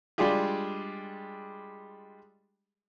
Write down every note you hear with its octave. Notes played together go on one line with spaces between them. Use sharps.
G3 G#3 D4 F4 G4 G#4